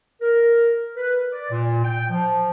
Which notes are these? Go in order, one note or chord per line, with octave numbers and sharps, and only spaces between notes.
A#4
B4
D5
A#2
G5
F3